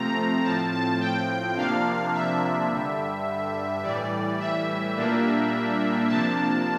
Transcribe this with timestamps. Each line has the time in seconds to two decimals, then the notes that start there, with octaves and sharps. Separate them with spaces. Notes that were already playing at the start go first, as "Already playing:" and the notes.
Already playing: C3 F3 A3 C4 A#5
0.44 A2 F3 C4 A5
0.72 A5
1.00 G5
1.56 C3 F3 A#3 D4 F5
2.14 E5
2.69 G2 D3 G3
3.83 A2 E3 G3 D5
4.39 E5
4.96 A#2 G3 A#3 D4
6.08 C3 F3 A#3 D4 A5